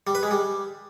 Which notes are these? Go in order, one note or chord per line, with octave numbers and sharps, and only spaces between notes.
G3
B4
G#3
G3